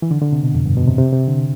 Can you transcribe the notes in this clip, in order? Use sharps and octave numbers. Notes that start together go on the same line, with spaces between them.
E3
D3
D3
C3
B2
F2
G2
B2
C3
C3
C3
D3